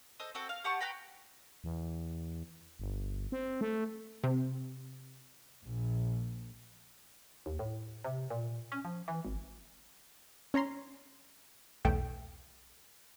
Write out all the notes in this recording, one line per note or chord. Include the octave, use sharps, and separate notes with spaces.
A4 C5 D#5
C4 F#4 A4
F5
G4 F#5 A5 C#6
B4 G5 A#5 B5
E2
G1
C4
A3
C3
A#1
D#2
A2
C3
A#2
C#4
F3
E3
G#1
C#4 C#5 A#5 C6
B1 E2 A3 G5